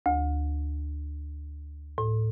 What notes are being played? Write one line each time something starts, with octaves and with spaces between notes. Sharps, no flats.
D2
A2